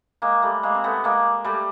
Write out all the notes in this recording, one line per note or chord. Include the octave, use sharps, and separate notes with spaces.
G#3 A#3
G3 A3
G#3 A#3
C4
A3 B3
G#3 A#3
G3 A3